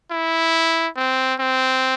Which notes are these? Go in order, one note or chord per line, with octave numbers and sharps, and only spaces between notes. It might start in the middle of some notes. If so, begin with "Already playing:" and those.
E4
C4
C4